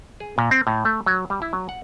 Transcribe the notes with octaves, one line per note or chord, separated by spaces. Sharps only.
G#4
A#2
C4
A2
A3
F#3
G3
E4
F#3
F#5